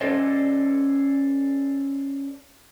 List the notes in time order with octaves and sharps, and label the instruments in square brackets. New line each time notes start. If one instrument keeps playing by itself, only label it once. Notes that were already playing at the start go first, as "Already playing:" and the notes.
[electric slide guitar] C#4 A4 C5 D5 D#5